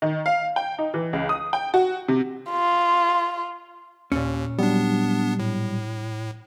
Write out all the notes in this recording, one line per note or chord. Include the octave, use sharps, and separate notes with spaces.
D#3
F5
G5
D#4
E3
C#2
D#6
G5
F#4
C3
F4
D#2 A#2 C#4
F#3 G3 B3 D4
A2